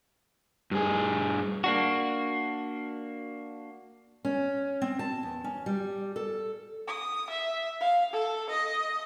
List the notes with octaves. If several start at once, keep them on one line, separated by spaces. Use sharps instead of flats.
G2 G#4
A#3 D4 F#4
C#4
C4
A5
E2
C#4
G3
A4
D#6
E5
F5
A4
D#5